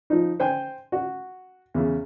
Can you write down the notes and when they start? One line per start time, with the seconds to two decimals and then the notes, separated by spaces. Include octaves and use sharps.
0.10 F3 D#4
0.40 C5 G5 G#5
0.92 F#4
1.74 E2 C#3